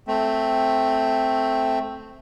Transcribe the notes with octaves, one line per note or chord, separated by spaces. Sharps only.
A3 C4